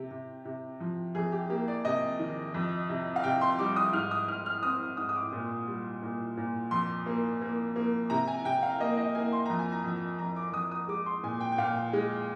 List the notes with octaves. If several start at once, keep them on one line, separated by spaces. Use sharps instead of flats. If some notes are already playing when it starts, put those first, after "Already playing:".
Already playing: C3 G4
C3
C3
F3
F2 G#4
G4
A#3 G4
D5
C3 D#5
D#3
F2
C3
F5
C3 G5
C6
G3 D6
D#6
G#2 F6
D#6
G#2 F6
F6
C4 D#6
G#2 D#6
D#6
D6
A#2
G3
A#2
A#2
F2 C6
A#3
A#3
A#3
C3 A#5
G#5
C3 G5
F5
A#3 D#5
D#5
A#3 G#5
C6
F2 A#5
G#5
A#5
F2
F2 A#5
D6
F2 D#6
D#6
G#3 D6
C6
A#2 G#5
G5
G5
A#2 F5
G#3